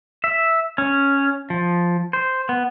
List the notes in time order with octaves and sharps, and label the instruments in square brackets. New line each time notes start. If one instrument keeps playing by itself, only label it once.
[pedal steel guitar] E5
C#4
F3
C5
B3